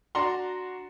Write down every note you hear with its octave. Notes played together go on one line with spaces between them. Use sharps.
D4 F#4 F#5 A#5 C6